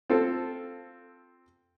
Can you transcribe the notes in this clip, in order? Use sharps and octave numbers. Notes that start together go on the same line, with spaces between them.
C4 F4 A4